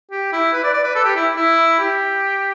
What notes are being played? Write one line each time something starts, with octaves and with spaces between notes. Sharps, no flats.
G4
E4
B4
D5
D5
B4
A4
G4
E4
E4
G4